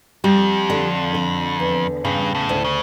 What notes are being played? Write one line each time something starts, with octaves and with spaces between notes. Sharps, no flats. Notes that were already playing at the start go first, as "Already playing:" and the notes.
F2 G3
D3
D3
E2
G2 C#3
A2
D2
C#3